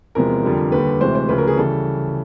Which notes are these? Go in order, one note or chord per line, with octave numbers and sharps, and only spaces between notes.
E2 C3 F3 G#3 A#4
F2 D3 G3
D#2 D3 G3 B4
D2 C3 E3 G#3 C5
C5
D2 C#3 F3 B4
A#4
G#4
C#3 E3 G3 A4